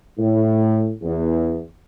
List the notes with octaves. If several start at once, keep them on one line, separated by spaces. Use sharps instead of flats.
A2
E2